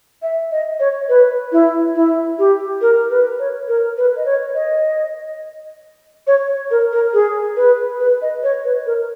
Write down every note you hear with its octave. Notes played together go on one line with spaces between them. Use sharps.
E5
D#5
C#5
B4
E4
E4
G4
A#4
B4
C#5
A#4
B4
D#5
C#5
D#5
C#5
A#4
A#4
G#4
B4
B4
D#5
C#5
B4
A#4